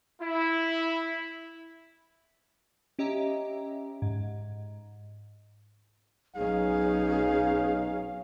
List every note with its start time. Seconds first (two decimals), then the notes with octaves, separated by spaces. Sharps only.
0.22 E4
2.99 C#4 G4 D#5 E5 A#5
4.02 G#2
6.36 B1 F#3 B3 C#4 D#4 G#4 F5